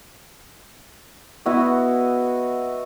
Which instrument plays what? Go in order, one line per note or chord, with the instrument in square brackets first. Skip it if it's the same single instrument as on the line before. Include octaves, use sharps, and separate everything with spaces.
[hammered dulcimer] B3 E4 F#4 D#5